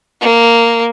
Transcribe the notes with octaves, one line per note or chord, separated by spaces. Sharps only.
A#3